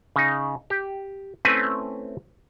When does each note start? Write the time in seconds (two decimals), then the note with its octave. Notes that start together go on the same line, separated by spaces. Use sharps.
0.16 C#3 D#4
0.70 G4
1.45 A3 C4 C#4 E4 B4 G#5